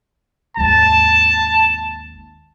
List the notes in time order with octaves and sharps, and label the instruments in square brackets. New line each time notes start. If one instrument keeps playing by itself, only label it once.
[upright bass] G#1 D#2 [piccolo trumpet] A5